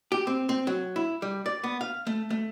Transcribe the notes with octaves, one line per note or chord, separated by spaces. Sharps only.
G4
C4
C4
F#3
E4
G3
D5
B3
F5
A3
A3